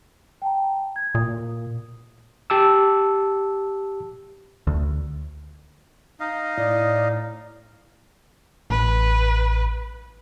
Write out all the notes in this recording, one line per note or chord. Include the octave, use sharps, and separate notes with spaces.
G5 A5 A#5
G#6
A#2 D#6
G4 A5 D6 E6
D2
D#4 D#5 F5
A2 D5
A1 B4